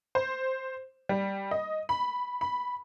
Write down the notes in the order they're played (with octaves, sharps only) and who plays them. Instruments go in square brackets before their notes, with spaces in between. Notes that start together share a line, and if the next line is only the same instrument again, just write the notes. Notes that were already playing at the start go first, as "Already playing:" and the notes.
[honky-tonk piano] C5
G3
D#5
B5
B5